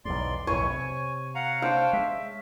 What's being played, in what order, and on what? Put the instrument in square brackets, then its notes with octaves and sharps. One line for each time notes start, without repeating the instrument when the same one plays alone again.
[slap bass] B1 E2 G#2 [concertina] D5 C6
[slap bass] B1 F2 A2 [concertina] E4 G#5 [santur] C#5
[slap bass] C3 [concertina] G#5
[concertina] F5 F#5 A#5
[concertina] D4 C5 G5 [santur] F5
[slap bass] G#3 [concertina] E5